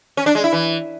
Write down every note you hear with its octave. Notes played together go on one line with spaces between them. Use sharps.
C#4
D4
G#3
E4
E3